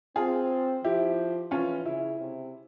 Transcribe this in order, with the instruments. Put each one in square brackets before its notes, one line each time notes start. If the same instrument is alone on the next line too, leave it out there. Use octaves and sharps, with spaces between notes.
[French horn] C4 [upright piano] F4 G#4
[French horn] F3 [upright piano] E4 G4
[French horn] E3 [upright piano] C#4 F4
[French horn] C#3 [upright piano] E4
[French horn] C3